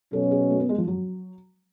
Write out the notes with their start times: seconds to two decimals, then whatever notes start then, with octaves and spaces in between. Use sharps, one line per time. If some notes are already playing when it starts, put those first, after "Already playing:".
0.13 B2 F#3 C#4 A4
0.31 G#4
0.50 A3
0.60 B3
0.69 G#3
0.78 F3
0.88 F#3